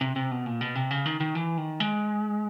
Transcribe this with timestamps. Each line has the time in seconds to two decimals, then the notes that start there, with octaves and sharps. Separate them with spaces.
0.01 C3
0.16 C3
0.31 B2
0.46 A#2
0.61 B2
0.75 C3
0.91 C#3
1.06 D#3
1.20 D#3
1.35 E3
1.58 D#3
1.80 G#3